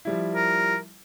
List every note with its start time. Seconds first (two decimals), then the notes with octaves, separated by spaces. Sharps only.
0.05 F3 G3 E4
0.35 A#4